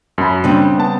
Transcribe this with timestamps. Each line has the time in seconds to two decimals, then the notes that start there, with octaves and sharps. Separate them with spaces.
0.18 F#2 B5
0.44 C#3 G3 C4 D4
0.77 B3 A5